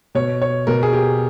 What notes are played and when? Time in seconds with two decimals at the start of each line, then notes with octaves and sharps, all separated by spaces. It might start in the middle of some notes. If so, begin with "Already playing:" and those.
0.15 B2 C#5
0.42 C#5
0.67 B2 A#4
0.83 G#4
0.93 G4